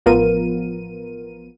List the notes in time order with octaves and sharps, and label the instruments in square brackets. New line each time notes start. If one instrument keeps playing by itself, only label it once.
[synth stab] A1 F3 B3 F4 A#4 D#7